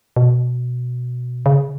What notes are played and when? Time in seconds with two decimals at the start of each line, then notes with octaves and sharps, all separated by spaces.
0.16 B2
1.46 C#3